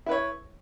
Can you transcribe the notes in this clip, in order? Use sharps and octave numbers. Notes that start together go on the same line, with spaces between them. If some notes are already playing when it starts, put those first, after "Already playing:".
E4 B4 C#5